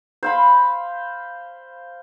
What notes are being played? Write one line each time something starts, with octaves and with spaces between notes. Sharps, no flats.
C5 F5 B5